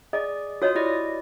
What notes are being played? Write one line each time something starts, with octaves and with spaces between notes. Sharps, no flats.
G#4 D5 D#5
F4 F#4 C#5 D#5 D#6
E4 G4 D5 D#5